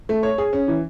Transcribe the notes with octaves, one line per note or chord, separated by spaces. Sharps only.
A3
C#5
G#4
C#4
E3